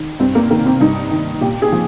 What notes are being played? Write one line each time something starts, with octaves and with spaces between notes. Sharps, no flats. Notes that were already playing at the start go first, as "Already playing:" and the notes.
Already playing: D#3
G2 C4
A#3
D#3 A#3
C4
G2 D#4
D#3
A#2 G4
G#4
F3